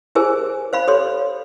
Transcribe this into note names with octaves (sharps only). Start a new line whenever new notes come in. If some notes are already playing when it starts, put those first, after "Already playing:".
E4 G4 G#4 A#4 C5 G#5
C5 F5 B5
G4 A4 C#5 C6